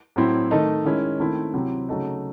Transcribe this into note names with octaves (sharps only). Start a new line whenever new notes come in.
A2 F#3 C4 E4
D#3 A3 D#4
D#3 G#3 C#4 E4
D#3 A3 C4 E4
C3 F#3 C4 E4
C#3 F#3 A3 D#4